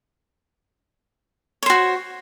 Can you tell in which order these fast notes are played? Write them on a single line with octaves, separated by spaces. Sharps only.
C#5 C5 F#4